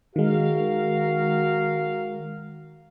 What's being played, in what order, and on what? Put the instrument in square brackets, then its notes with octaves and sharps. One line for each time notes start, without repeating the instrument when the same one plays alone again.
[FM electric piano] D#3 G#3 [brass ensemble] F#4 A#4 F5